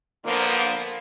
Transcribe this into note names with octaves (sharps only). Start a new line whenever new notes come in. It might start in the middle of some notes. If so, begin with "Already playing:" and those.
A#2 D3 F3 A#3 B3